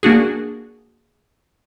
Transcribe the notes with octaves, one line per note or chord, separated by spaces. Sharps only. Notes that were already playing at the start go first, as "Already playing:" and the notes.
A#3 D4 F#4 G#4